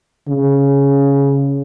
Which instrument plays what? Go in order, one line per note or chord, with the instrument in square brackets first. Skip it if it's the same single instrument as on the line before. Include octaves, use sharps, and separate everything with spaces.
[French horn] C#3